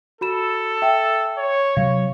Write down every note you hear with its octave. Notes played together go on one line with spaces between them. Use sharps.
F#4 A4 B5 E7
E5 G5
C#5
C3 F#3 C#5 F5